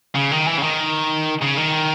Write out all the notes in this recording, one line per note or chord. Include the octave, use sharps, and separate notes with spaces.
C#3
D#3
E3
C#3
D#3
C#3
D#3